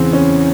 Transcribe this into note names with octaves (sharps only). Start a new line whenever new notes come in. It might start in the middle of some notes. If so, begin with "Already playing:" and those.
Already playing: E2 C#3 E3 C4
C#4